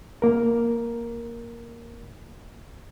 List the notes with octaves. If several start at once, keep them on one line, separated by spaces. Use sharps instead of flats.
A#3 A#4